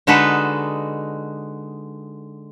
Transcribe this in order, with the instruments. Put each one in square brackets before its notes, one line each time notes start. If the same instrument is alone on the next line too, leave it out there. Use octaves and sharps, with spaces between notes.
[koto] D3 G#3 D#4 F#4 A4 B4